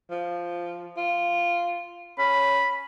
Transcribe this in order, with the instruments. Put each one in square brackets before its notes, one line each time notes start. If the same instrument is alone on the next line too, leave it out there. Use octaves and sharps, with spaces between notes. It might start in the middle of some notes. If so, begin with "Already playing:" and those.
[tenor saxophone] F3
F4
[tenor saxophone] C#4 [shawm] B5